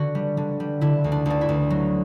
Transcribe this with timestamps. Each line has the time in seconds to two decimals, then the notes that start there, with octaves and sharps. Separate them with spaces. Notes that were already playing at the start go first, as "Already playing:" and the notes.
Already playing: D3 F#4
0.15 G3
0.37 D3
0.60 G3
0.81 D3 E4
1.04 D2
1.12 D4
1.26 D2 D4
1.41 E4
1.49 D2
1.70 F#3